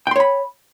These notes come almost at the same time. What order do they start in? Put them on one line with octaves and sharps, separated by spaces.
G5 C6 C#5 B5